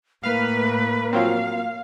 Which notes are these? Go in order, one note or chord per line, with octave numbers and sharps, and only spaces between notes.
A2 A#3 B4 F5 F6
F3 F#3 C4 F5